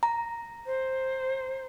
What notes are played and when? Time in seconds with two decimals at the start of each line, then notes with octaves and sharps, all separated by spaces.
0.03 A#5
0.66 C5